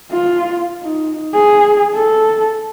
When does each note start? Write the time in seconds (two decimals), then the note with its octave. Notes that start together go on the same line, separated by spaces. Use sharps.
0.12 F4
0.83 D#4
1.34 G#4
1.95 A4